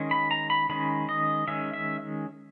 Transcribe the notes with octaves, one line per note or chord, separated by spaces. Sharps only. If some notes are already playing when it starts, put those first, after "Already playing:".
Already playing: D#3 G#3 C#4
B5
A#5
B5
D#3 G#3 C#4 B5
D#5
D#3 G#3 C#4 E5
E5